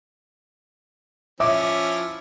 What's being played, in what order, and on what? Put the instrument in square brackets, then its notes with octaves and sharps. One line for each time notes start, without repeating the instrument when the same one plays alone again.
[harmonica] F3 C#4 E4 [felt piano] E5 D6